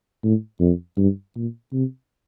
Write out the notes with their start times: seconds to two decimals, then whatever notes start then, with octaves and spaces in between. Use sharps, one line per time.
0.23 A2
0.60 F2
0.97 G2
1.36 A#2
1.73 C3